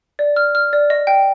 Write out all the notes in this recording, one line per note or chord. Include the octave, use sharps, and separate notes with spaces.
D5
F6
F6
D5
D#5
G5